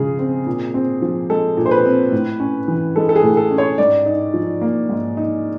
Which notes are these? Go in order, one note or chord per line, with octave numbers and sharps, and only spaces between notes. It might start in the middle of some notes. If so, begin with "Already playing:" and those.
Already playing: C#3 F3 G#3 G#4
C4
A#2
C4
F3
G#3 A4
A#2
C5
B4
C4
A2
C#4
E3
G#3 A4
A4
G#4
A2
A4
C#4
C#5
G#2 D5
D#4
F3
A#3
G#2
D#4